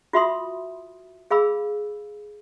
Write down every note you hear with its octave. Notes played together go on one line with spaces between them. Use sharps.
F4 F#4 E5 B5 C6 D#6
G#4 F5 B5 E6